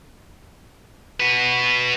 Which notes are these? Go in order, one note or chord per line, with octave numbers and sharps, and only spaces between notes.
F#4 B4